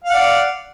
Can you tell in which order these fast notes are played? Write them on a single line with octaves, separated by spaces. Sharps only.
F5 F#5 D5